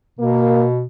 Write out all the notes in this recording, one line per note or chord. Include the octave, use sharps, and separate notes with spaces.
B2 A#3